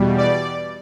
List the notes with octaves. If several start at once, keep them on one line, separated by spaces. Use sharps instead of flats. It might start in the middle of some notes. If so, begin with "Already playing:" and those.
Already playing: E2 B2 G3
D5